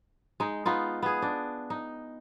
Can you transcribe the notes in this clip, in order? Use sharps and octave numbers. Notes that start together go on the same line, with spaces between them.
G#3 D#4
B3 D#4 F4
B3 G#4
D4
D#4